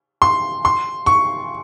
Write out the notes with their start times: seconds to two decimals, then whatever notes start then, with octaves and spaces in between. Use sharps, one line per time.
0.22 C6
0.65 C6
1.06 C#6